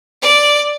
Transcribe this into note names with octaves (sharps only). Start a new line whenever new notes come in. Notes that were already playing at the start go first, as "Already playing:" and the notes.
D5